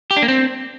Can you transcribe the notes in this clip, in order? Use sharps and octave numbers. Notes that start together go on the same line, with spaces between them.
G4
D4
A#3
C4